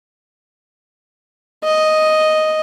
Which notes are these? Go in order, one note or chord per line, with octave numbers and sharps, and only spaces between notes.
D#5